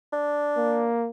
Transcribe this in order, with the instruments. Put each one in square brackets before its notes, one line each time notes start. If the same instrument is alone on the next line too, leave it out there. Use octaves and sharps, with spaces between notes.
[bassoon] D4
[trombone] A#3